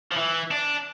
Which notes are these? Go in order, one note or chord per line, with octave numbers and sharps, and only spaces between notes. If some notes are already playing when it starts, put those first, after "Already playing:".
F3
E3
D4